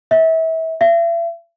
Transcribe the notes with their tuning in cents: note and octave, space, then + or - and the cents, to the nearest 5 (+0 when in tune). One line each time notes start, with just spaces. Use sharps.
E5 -30
E5 +40